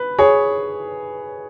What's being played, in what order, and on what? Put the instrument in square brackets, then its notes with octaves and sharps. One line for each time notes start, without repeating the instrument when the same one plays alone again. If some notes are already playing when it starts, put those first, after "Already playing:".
Already playing: [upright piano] B4
G#4 C#5